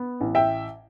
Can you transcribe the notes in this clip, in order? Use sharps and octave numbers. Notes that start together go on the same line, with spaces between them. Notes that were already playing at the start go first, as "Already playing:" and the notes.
Already playing: B3
A1
E5 G5